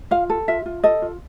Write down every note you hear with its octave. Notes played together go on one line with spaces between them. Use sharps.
F4 F5
A4
F4 E5
F4
A4 D#5
F4